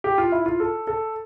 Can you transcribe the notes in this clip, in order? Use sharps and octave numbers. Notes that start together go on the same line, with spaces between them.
G4
F4
E4
F4
A4
A4